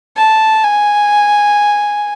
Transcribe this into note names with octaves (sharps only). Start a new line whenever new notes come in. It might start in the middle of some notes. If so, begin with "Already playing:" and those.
A5
G#5